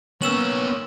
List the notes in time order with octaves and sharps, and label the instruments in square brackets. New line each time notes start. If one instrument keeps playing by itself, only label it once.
[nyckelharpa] A#3 C#4 [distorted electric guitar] B3 C#5 [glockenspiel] E6 E7 F#7